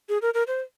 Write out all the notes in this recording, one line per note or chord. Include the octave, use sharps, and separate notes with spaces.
G#4
A#4
A#4
C5